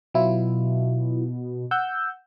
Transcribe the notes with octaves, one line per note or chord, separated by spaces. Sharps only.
B2 F#3 E4 F4
F#5 E6 G6